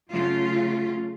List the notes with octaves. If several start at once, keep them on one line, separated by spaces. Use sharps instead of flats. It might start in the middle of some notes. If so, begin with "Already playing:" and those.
C#3 F#3 A3 F4